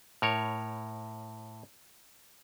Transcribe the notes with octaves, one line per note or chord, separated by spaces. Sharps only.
A2 A#4 C#5